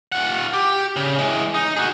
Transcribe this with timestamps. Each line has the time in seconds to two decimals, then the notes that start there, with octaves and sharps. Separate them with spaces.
0.12 F4 F#5
0.53 G4
0.96 C#3
1.19 E3 G#3
1.54 D#4
1.76 F#4 G#4